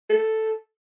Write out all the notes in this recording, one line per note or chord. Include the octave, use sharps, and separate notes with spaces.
A4